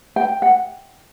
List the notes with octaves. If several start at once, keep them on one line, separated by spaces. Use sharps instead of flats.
G5
F#5